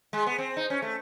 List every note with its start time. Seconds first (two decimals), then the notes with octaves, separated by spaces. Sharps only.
0.13 G#3
0.27 B3
0.39 C4
0.57 D#4
0.70 C#4
0.82 A3